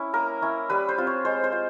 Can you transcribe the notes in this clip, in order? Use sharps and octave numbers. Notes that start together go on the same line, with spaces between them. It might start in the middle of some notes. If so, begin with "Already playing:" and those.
Already playing: C#4 E4
A#3 A#4
C#4 E4
G3 B4
C5
C4 F4
C#5
G#3 C5
C5
F4